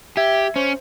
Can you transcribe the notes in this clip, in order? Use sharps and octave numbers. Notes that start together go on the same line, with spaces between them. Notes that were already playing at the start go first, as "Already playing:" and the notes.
G4 E5 G#6
C#4 C5